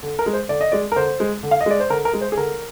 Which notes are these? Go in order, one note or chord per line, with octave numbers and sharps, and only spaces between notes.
D3
A#4
G#3
C5
D3 D5
D#5
G#3 D5
A#4
D3 C5
G#3
D3
F5
D#5
G#3 D5
C5
D3 A#4
A#4
G#3
C5
G#4
D3 A#4